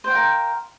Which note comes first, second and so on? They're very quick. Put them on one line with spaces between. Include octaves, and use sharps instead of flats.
C5 G5 F5 A#4